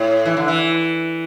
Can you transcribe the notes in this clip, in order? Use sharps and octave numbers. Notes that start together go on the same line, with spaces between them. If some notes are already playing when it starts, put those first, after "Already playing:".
Already playing: A2
E3
D3
E3